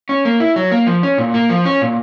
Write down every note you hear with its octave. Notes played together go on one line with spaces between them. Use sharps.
C#4
A#3
E4
F#3
A#3
F3
C#4
A#2
A#3
F3
C#4
A#2